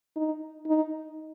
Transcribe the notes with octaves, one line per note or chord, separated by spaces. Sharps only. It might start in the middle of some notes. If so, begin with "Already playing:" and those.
D#4
D#4